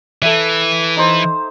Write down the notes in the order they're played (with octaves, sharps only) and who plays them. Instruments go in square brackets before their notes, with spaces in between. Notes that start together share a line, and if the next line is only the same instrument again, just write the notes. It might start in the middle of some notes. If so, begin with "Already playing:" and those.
[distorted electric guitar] E3 [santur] A4 E5
[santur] D#4 C5